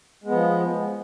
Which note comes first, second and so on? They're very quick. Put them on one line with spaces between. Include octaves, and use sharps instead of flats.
G#3 B3 F3